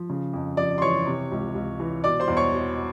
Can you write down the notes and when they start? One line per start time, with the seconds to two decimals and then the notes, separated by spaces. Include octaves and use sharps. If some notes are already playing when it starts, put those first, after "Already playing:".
Already playing: F3
0.10 C#3
0.34 F2
0.57 F2 D5 D6
0.78 C6
0.82 E3 C#5 C#6
1.06 C3
1.32 C#2
1.55 C#2
1.80 E3
2.04 B2 D5 D6
2.20 C5 C6
2.28 E2
2.37 C#5 C#6
2.53 B2